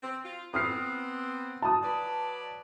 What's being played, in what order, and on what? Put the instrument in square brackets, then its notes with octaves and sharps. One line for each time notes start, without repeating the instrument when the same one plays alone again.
[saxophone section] C4
F4
[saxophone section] B3 C4 [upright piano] D#6 F6 C7
[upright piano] A5 D#6
[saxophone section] F#3 B4 D5